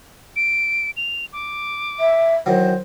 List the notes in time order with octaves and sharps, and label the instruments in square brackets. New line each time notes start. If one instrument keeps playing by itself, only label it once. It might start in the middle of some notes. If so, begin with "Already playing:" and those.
[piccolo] D7
F7
D6
[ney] E5
[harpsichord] D#3 E3 F#3 [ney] C5